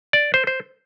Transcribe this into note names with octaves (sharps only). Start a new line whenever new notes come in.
D5
C5
C5